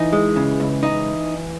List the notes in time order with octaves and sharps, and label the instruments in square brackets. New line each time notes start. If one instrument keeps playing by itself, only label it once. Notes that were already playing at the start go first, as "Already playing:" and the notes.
Already playing: [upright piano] E3 [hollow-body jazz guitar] D#4
[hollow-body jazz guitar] G#3
C#3
C#2
D#4